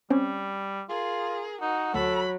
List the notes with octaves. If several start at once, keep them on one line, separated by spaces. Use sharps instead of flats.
G3 C4 C#4
F4 G#4 A#4
D#4 F#4
D2 F#3 A4 B5